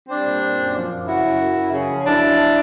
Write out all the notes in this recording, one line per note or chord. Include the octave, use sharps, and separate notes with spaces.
G3 C4 D4
A#2
A#2
F#2
F3
F#2
C#3 E4 F#4
F#2
F#2
F#2
C#3
F3
F#2 D4 E4
F3